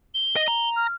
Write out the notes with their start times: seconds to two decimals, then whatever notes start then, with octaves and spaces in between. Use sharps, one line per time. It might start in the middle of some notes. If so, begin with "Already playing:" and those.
0.14 G7
0.36 D#5
0.48 A#5
0.76 F6